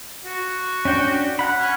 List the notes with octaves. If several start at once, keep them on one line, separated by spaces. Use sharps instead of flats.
F#4
C#4 D4 G5
F#5 B5
C#4